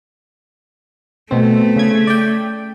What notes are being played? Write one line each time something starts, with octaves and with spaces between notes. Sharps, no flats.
B2 A3 C4
C#3 G#6
D5 G5